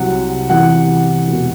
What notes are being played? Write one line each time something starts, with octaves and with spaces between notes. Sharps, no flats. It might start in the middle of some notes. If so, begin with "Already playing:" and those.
Already playing: C2 C3 F#3 F#5
E2 C3 E3 F#5
E1 B2